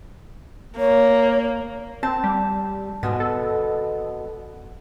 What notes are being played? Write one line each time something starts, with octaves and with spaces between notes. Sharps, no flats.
A#3 C#5
C4 A5
G3
G#2 B2 D3 B3
A4